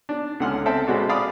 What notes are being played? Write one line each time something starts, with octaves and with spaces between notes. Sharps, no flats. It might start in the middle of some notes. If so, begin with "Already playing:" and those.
D4
C#2 D3 F#5 C6 F6
C4 A4 E5
A1 B2 G#3 F#4 D5
D5 F5 B5 D6 D#6